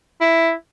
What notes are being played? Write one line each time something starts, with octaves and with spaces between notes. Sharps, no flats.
E4